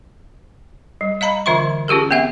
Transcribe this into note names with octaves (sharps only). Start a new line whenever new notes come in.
G3
D#5 F5 A#5 B5
D3 E3 F4 E5 C6 C#6
C#4 F4 G4 G#4 A#4
B3 C4 E5 F#5